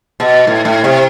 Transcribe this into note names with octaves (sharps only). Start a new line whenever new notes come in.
B2
A2
A2
C3